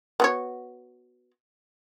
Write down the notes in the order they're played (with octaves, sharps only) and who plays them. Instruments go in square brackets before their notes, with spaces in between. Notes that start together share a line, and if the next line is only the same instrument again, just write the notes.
[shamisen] B3 F#4 C#5